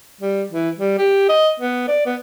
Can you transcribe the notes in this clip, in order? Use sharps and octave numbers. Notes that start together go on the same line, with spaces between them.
G3
E3
G3
G4
D#5
B3
D5
B3